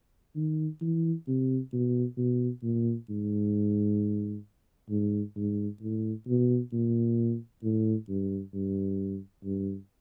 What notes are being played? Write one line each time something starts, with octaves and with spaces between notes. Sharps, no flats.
D#3
E3
C3
B2
B2
A#2
G#2
G#2
G#2
A2
B2
A#2
A2
G2
G2
G2